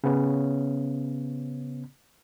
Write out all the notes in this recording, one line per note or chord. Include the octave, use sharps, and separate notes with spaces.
C#3 B3 C#4